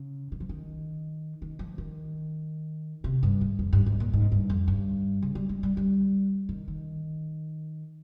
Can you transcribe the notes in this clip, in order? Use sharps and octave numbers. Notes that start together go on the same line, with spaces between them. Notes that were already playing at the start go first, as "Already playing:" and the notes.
Already playing: C#3
D#3
F3
D#3
D#3
F3
D#3
C3
G2
G#2
F2
G2
G#2
A#2
G#2
G2
F2
G2
C#3
G3
G#3
G3
G3
D#3
D#3